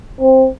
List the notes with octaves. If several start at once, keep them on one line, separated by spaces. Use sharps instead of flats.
C4